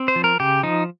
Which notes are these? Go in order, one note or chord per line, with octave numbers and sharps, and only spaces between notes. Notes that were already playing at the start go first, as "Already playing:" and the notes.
Already playing: C4
C5
F3
A#4
C#3 G4
F3 D#4